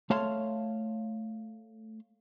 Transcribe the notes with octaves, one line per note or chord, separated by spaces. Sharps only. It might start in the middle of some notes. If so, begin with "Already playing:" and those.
A3 C#5 F5 A5 C6